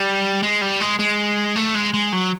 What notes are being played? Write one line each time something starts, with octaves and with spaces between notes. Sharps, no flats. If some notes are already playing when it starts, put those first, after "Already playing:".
Already playing: G3
G#3
G3
G#3
G#3
A3
G#3
G#3
F#3